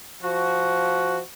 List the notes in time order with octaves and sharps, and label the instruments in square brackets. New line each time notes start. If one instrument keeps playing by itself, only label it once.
[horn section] F3 F#4